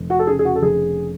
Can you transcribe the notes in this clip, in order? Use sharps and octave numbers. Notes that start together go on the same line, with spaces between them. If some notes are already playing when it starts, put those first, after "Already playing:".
Already playing: F1
F#4
A4
C#3 G#4
G#4
F#4
A4
F1 G#4